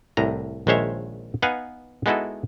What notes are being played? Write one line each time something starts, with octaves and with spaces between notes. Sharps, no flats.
C2 A2 A#5
A#1 D#3 G#3 C5 C#5 E5
B3 D#4 B4 F5 F#5 G#5
G#3 B3 D#4 E4 F#4 A4